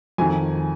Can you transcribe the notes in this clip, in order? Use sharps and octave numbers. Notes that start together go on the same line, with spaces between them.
F2 D#3 G#5